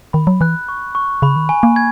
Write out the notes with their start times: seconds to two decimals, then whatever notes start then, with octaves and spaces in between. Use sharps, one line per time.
0.13 D#3 B5
0.27 F#3
0.41 E3 F#6
0.68 C#6
0.95 C#6
1.22 C#3 B5
1.36 D#3
1.49 G#5
1.63 A#3
1.76 G#6